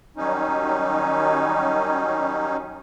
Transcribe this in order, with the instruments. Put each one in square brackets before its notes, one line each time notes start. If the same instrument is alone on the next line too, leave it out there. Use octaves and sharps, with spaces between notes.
[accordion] D#3 F#3 G3 C#4 D#4